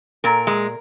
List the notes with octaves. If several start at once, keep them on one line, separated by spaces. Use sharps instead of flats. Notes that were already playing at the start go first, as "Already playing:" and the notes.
A#2 A#4
G#3